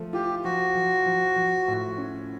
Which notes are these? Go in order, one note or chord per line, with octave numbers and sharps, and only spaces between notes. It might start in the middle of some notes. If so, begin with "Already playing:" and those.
Already playing: F3 A3
F4 G4
F3 F#4
F3
F3
F3
A2
C#4